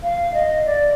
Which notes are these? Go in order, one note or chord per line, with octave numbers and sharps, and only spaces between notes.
F5
D#5
D5